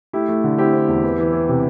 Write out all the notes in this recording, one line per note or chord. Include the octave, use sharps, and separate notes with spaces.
A3 E4 G4
A3
D3
C4 E4 G4
C4
E2
E3
E3
E3
C3